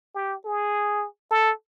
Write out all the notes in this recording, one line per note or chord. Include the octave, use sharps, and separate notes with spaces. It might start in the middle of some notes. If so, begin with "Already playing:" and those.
G4
G#4
A4